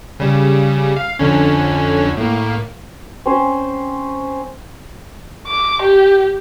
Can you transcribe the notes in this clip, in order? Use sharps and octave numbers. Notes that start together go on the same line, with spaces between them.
C#3 G3
F5
F2 D3 C#4
A2 A#3
C4 C#4 C5
D6
G4